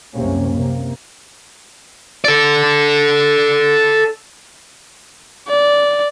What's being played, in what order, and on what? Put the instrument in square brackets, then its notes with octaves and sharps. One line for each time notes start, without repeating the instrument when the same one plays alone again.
[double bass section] C2 F#2 C3 A#3 C#4
C3 A#3
[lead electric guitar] A4 D5
[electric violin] D5